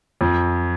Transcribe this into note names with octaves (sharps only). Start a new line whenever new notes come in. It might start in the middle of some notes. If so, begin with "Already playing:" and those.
F2